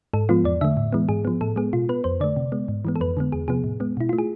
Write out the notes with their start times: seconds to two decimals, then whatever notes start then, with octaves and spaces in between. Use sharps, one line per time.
0.13 G#2 A4
0.29 F3 G#3 B3 F4
0.44 E2 D5
0.61 D3 A3 E5
0.77 A2
0.93 E3 G#3 B3
1.09 G#2 G#4
1.25 F3 B3
1.41 A2 A4
1.56 G#3 B3 G#4
1.73 B2 F4
1.89 B3 B4
2.04 F2 C5
2.20 D3 A3 D5
2.36 C3
2.52 G#3 B3
2.68 G#2
2.85 E3 G#3 B3
2.96 A4
3.00 F2 B4
3.17 D3 G#3 B3
3.32 E2 G#4
3.48 C3 F3 B3 G#4
3.64 A2
3.80 G#3 B3
3.97 B2 E4
4.09 A3 F4
4.19 G#4